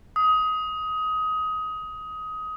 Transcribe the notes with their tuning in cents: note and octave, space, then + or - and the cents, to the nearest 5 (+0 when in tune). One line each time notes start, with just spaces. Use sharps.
D#6 +20